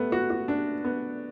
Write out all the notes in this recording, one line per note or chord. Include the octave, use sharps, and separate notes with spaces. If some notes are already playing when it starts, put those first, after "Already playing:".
Already playing: A3 B3
F#4
F#4
D4
B3